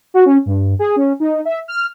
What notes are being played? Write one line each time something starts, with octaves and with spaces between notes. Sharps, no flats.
F#4
C#4
G2
G#4
C#4
D#4
E5
F6